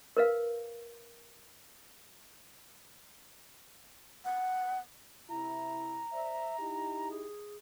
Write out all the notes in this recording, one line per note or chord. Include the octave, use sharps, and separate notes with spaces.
A#4 B4 F5
F#5
C3 E4 A#5
C5 D5 E5
D#4 E4 G4
G#4